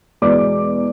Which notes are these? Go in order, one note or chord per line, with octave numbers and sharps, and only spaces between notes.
E2 B2 G#3 D5 D6